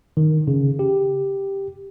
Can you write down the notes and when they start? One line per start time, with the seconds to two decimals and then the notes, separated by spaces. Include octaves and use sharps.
0.17 D#3
0.47 C#3
0.79 G4